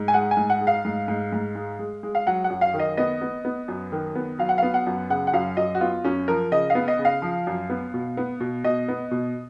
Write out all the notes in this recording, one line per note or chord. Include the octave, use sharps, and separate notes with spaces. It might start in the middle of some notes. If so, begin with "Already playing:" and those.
Already playing: G#2
G#5
G#3 F#5
G#5
G#2
F#5
G#3
F5
G#2
G#2
G#2
G#3
G#3
G#3
F5
F#3 F#5
F#5
F#2
F5
D#3
D#5
B3 D#5
B3
B3
F#2
D#3
B3
F#3 F5
F#5
B3 F5
F#5
F#2
C#3 F#5
F#5
F#2 F5
F#2 D#5
F#4
B3 F4
F#2 C#4
F3 A#4
C#3 D#5
F5
B3
D#5
C#3
F5
F3
F#2
B3
B2
B3
B2
B2 D#5
B3
B2